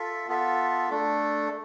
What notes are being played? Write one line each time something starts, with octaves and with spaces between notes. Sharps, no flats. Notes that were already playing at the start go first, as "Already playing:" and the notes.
Already playing: F4 A4 E5
B3 F4 A4 E5
A3 D4 A4